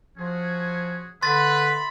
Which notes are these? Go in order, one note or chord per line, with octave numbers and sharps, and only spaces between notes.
F3 C#4 F#4 G#4
D3 B4 E5 B5 C6 A6